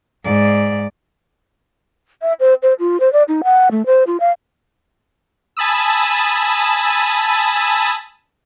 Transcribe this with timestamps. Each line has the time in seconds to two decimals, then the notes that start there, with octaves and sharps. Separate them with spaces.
0.24 G#2 D5
2.22 E5
2.40 C5
2.63 C5
2.79 F4
3.00 C5
3.13 D5
3.28 D#4
3.44 F#5
3.71 A3
3.86 C5
4.07 F4
4.20 F5
5.57 G#5 A5 B5 D#6 E6